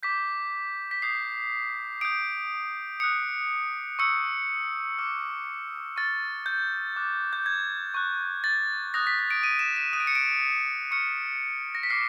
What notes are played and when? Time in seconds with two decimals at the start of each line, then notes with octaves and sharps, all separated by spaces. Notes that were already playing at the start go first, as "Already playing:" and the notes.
0.03 D6 G6 B6
0.91 B6
1.02 D#6 G6 C7
2.01 D#6 G6 D7
3.00 D#6 F#6 C#7
3.99 C#6 E6 G6 C#7
4.99 D6 F6
5.96 C#6 F6 A6
6.46 G6
6.96 D6 F#6
7.33 G6
7.46 G#6
7.94 C#6 F#6
8.44 A6
8.94 D#6 F#6 A#6
9.07 B6
9.19 A#6
9.31 D7
9.43 D#7
9.59 E7
9.77 E7
9.93 D#6 D#7
9.96 F#6 D7
10.07 C#7
10.15 D7
10.91 C#6 F6 C#7
11.75 A#6
11.83 B6
11.90 D6 F6 C7